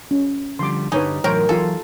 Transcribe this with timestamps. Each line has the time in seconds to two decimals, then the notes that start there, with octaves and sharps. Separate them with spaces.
0.11 C#4
0.59 D3 F3 G3 C6 D6
0.92 G2 D3 G3 D#4 B4 C#5 G#5
1.24 A2 E3 F#3 A#4 C5 C#5 G5
1.49 E3 F#3 F4 A4 F5 G#5